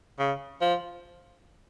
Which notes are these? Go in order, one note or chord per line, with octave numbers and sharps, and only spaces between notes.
C#3
F3